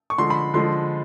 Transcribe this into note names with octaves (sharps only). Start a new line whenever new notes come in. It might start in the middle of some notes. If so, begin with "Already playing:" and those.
C#6
D3 F3 G#3 C6
B5
D3 F3 G#3 C6